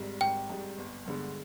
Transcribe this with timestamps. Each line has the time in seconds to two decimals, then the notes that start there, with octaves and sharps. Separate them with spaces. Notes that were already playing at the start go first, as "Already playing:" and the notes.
Already playing: G#1 G#2 G3
0.21 G#1 G5
0.49 G#2 G3
0.78 G1
1.06 G2 D3 G#3 B3